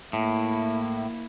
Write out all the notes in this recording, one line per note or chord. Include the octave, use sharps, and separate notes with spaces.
A2 A#3 E4